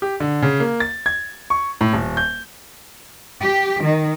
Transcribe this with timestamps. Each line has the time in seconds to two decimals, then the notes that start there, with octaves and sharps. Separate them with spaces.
0.02 G4
0.20 D3
0.42 C#3
0.60 A#3
0.80 A6
1.06 G#6
1.50 C#6
1.81 A2
1.93 D#1
2.17 G6
3.41 G4
3.83 D#3